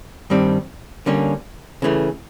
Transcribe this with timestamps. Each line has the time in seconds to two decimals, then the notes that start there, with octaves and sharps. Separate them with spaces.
0.30 G2 D#3 G3 C4
1.06 D3 G3 A#3 C#4
1.82 C#3 E3 A3